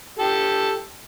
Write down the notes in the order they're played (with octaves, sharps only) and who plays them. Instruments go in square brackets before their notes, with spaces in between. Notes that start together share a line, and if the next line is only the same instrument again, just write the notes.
[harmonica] G4 A4